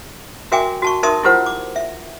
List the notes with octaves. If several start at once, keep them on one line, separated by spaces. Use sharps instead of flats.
F#4 A#4 E5 G5 G#5 D6
F#4 A5 C#6
D#4 A#4 E5 A5 C6 D#6
E4 F4 G4 A#4 C5 F#5
D6
E5